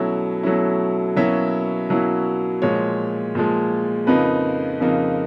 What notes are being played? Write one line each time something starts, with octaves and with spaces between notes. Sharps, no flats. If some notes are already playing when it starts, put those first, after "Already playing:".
Already playing: B2 F#3 A3 C#4 E4 E5
B2 F#3 A3 C#4 E4
B2 F#3 A#3 C#4 E4 E5
B2 F#3 A#3 C#4 E4
A#2 F3 G#3 C#5
A#2 F3 G#3
F2 C#3 F3 A#3 D#4 B4
F2 C#3 F3 A#3 D#4